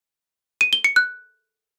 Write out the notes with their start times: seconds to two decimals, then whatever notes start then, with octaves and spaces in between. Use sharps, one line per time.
0.61 D#7
0.73 G7
0.84 C#7
0.96 F#6